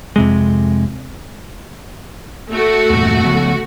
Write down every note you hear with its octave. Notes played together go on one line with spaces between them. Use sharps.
F2 C3 G#3
A3 F#4
E2 G2 A#2
C#3 F3 B3